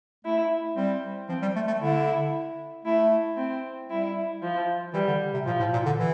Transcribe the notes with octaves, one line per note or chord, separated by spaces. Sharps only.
A3 E4
G3 C4
F3 C4
G3
A3
A3
D3 E4
A3 E4
C4
G3 E4
F3
E3 G3
D3
C3
A#2 F3
A2
A#2
D3
E3